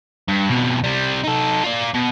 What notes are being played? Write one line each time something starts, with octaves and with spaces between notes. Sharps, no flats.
G2
F2 B2
C3 G3
D#4 A4
F4 D5
B2